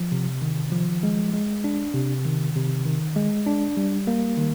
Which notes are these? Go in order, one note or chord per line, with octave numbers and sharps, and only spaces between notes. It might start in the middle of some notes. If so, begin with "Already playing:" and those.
Already playing: F3
C3
D#3
F3
G#3
G#3
D4
C3
D#3
C3
D#3
G#3
D4
G3
A#3
D#3